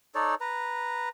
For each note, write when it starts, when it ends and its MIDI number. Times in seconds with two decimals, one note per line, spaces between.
0.15 0.35 63
0.15 0.35 69
0.15 0.35 73
0.15 0.35 74
0.41 1.09 71
0.41 1.09 82